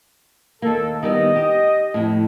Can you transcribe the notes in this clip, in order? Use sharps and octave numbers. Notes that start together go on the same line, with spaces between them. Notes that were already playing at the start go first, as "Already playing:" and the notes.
D#2 A#3 A4
D#3 G3 B3 D#5
G4
F2 A2